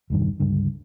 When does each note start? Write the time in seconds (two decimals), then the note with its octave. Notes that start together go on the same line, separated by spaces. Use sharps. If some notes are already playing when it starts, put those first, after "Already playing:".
0.10 E1 C2 G2 D#3
0.40 C#2 G2 D3